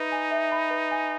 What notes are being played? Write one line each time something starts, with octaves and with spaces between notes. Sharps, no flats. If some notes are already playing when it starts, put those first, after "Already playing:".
Already playing: D#4 B4 E5 B5
G#5
E5
B5
B4
G#5